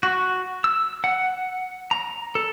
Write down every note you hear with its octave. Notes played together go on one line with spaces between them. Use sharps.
F#4
E6
F#5
A#5
A4